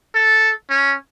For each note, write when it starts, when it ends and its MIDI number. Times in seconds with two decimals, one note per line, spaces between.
0.15 0.50 69
0.70 0.94 61